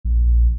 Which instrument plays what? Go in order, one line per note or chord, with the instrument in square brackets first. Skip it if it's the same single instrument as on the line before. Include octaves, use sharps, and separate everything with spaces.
[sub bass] A#1